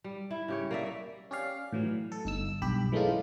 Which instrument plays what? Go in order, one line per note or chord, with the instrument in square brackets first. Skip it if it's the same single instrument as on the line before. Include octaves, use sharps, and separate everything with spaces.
[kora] G3
E4
C#3 G4 C#5
A#3 D5 E5
[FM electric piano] C#4 G4 D5 F5
A2 E3 F#3
A4
G1 D#4 E6
B1 G2 G4 B5
E3 G#3 A3 C#4 D#4 F4